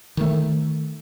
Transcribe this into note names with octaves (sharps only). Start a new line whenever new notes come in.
D#3 A3